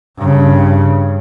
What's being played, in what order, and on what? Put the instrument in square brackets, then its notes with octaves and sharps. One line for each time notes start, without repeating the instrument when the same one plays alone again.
[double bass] G2 C#3